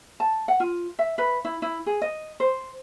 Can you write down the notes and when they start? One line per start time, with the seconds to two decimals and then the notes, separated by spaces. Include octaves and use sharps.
0.20 A5
0.48 F#5
0.60 F4
0.99 E5
1.18 B4
1.45 E4
1.62 E4
1.86 G#4
2.02 D#5
2.40 C5